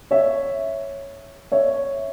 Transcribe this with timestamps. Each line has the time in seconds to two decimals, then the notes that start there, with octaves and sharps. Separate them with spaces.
0.11 C#5 E5
1.52 C#5 E5